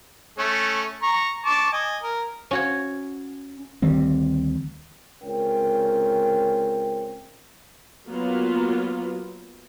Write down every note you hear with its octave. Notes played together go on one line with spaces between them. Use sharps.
A3 C#4
A#5 C#6
A5 C#6 D6
D#5 G#5
A#4
C#4 F#4 C#5
D2 D#3 G3 C4
C#2 C4 C#4 A#4 G5
F#3 A#3 B3 F4